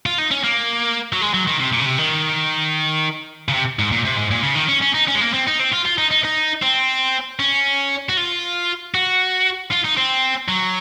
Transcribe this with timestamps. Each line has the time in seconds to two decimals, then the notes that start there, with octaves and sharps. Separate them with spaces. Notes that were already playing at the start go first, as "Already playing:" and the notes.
0.06 F4
0.18 D#4
0.31 C#4
0.44 A#3
1.13 F#3
1.21 G#3
1.34 F#3
1.47 D#3
1.60 C3
1.73 A#2
1.80 C#3
1.86 C3
1.98 D#3
3.48 C#3
3.53 C3
3.79 G#2
3.92 A#2
4.05 C3
4.17 G#2
4.31 A#2
4.43 C#3
4.56 D#3
4.69 C#4
4.82 C#4
4.95 D#4
5.08 C#4
5.15 G#3
5.21 A#3
5.34 C4
5.47 D#4
5.59 C4
5.72 F4
5.85 F4
5.98 D#4
6.11 D#4
6.24 D#4
6.62 C4
7.40 C#4
8.09 F#4
8.17 F4
8.95 F#4
9.72 F4
9.85 D#4
9.97 C4
10.48 F#3